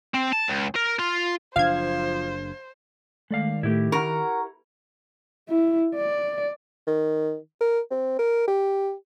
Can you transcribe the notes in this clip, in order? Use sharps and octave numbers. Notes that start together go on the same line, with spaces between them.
C4
A5
C#2
A#4
F4
F#1 C3 F3 D4 C5 F5 G#6
D#3 G#3 A3 D5 F5
A2 A3 E4 G4
A#4 F#5 A#5 C#6
E4
D5
D#3
A#4
C4
A#4
G4